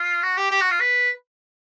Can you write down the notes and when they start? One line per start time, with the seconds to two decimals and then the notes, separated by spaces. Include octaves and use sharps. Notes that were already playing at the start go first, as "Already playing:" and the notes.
Already playing: F4
0.23 F#4
0.37 G4
0.51 G4
0.61 F#4
0.70 F4
0.80 B4